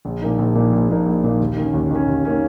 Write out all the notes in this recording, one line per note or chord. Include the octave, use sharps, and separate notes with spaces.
A#1
A#2 F3 A#3 D#4
A#1
A#2 F3 A#3 D#4
A#1
A#2 F3 A#3 D#4
A#1
A#2 F3 A#3 D#4
D#2
D#3 A#3 C#4
D#2
D#3 A#3 C#4
D#2
D#3 A#3 C#4